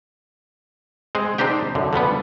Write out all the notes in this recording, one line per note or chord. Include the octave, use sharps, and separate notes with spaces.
G#3 C4 G#4
C4 D4 D#4 G4 G5
F#2 D3
D3 F3 G3 B3